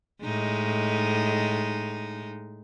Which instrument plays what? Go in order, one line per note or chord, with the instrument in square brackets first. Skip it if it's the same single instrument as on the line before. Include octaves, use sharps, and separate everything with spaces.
[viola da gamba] A2 G#3 D#4